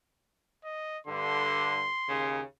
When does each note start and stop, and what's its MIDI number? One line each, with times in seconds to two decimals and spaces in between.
0.64 0.98 75
1.07 1.87 43
1.07 1.87 50
1.07 2.42 84
2.08 2.41 39
2.08 2.41 49